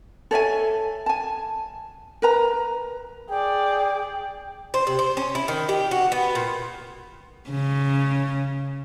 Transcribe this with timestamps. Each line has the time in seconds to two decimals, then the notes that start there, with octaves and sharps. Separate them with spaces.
0.31 A4 C#5 E5 G#5
1.06 G#5 A5
2.22 A#4 B4 A#5
3.29 G#4 D5 G5
4.74 C5
4.87 C3
4.99 C5
5.17 C#4
5.35 E4
5.48 D#3
5.69 G4
5.91 F#4
6.12 B3
6.35 A#2
7.50 C#3